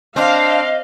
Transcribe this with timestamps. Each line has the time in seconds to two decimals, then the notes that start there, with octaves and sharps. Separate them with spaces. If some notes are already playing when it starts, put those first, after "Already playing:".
0.16 C4 D4 C5 D#5 F5